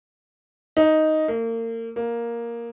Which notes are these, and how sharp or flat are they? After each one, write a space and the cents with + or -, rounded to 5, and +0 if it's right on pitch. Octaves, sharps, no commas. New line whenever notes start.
D#4 +5
A#3 -35
A#3 +5